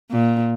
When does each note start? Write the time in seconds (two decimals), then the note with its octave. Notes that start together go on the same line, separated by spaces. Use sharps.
0.11 A#2